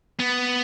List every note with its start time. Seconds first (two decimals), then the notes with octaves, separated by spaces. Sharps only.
0.20 B3